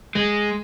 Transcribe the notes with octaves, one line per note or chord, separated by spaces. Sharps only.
G#3